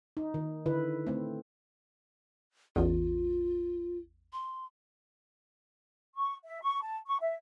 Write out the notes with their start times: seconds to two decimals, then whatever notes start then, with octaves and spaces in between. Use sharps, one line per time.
0.17 D#4
0.34 D#3
0.66 D3 E4 B4
1.07 A3 C4
2.76 A1 E2 F4
4.33 C6
6.15 C#6
6.45 E5
6.61 C#6
6.81 A5
7.07 C#6
7.20 E5